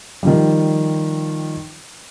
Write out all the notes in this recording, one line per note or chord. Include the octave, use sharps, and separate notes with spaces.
D#3 F3 G3